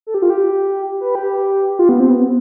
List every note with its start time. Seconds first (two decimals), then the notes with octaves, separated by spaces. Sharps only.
0.07 A4
0.14 G4
0.22 F4
0.30 G4
1.01 B4
1.15 G4
1.70 G4
1.79 F4
1.89 B3
2.00 C4
2.10 B3